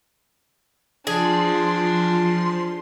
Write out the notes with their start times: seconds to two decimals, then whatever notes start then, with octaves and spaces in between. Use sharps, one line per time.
1.07 F3 D4 G#4 C6